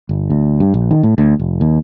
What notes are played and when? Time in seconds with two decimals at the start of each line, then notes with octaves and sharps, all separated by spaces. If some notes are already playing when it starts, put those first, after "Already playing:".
0.09 G1
0.30 D2
0.60 G2
0.74 A#1
0.91 D#3
1.03 A2
1.18 D2
1.39 F1
1.61 D#2